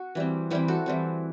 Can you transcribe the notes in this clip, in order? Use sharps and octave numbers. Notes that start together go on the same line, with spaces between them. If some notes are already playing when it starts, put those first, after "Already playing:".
Already playing: F#4
E3 G3 C4
E3 G3 C4 E4 G4
F#4 A4
E3 G3 C4